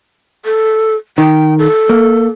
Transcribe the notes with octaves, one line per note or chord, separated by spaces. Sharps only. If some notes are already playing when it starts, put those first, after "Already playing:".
A4
D#3 G5
A4
A#3